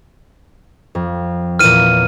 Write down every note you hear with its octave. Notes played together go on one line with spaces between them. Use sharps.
F2
E2 A#2 F6 D#7